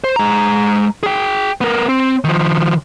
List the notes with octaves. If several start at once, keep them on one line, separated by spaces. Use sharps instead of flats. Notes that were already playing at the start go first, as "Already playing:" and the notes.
C5
G#3 A#5
G#4 G5
B3 A#4
C4
D#3 F3